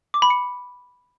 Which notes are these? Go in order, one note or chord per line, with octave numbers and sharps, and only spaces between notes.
D6
B5
C#7